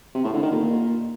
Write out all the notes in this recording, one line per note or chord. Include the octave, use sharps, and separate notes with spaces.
C3
A2
D3
D#3
A#2